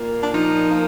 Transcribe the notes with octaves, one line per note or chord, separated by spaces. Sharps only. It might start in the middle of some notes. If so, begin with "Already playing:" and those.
Already playing: A#2 A#3
D4
F3 D#4
A#3